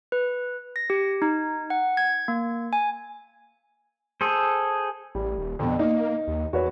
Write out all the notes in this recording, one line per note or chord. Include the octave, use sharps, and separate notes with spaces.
B4
A#6
G4
D#4
F#5
G#6
A#3
G#5
G#4 A4 C5
A1 G3
D#1
F2 B2 D3
A#3 D#4
D#2
E2 F#4 B4 C#5